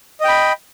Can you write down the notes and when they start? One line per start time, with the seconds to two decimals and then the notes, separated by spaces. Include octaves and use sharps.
0.21 D#5
0.25 G5
0.28 B5